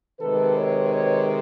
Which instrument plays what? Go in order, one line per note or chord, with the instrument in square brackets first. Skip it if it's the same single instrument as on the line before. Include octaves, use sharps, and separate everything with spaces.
[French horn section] C3 D#3 G#3 A4 B4
B4 C#5
B4 C#5